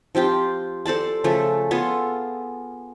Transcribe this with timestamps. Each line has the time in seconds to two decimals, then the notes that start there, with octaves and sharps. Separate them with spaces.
0.15 F3 C4 F4 G4
0.86 A4 C5 D5 A5
1.24 C#3 F3 A3 A4
1.71 B3 F4 G#4 A4